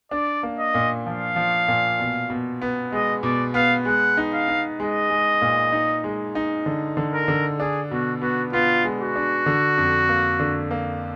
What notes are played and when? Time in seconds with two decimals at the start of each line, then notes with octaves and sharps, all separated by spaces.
0.11 D4 D5
0.43 A#3
0.58 D#5
0.74 A#2
1.05 F3 F5
1.36 F3
1.68 A#2
1.99 B2
2.30 B2
2.62 B3
2.93 G#3 D#5
3.23 B2 D5
3.54 B3 F5
3.85 G#3 F#5
4.17 D#4
4.33 F5
4.48 D#4
4.79 G#3 D#5
5.10 G#3
5.42 A#2
5.72 D#4
6.04 G#3
6.35 D#4
6.66 D3
6.97 D3
7.13 A#4
7.28 D3
7.59 D4 G#4
7.91 B2 F#4
8.22 B3 F#4
8.53 B3 F4
8.84 G#3
9.01 F#4
9.15 D4
9.46 D3
9.78 F2
10.09 A#3
10.40 D3
10.71 A#3